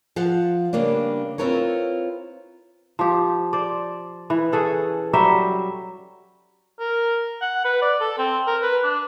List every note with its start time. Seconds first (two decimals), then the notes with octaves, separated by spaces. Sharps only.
0.16 F3 F5 F#5
0.73 C#3 G3 A#3 B3 D4
1.38 C4 E4 F4 A#4 B4 C#5
2.99 F3 G4
3.53 C5 D5
4.30 E3
4.52 C#4 G#4 A4 F#5
5.13 F#3 G3 E5 G5
6.80 A#4
7.41 F#5
7.65 B4
7.82 D5
8.01 A4
8.18 C4
8.47 A#4
8.63 B4
8.84 D4